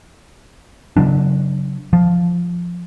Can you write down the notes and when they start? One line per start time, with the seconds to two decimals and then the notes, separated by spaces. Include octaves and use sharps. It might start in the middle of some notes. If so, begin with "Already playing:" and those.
0.97 C#3 F#3 D4
1.93 F3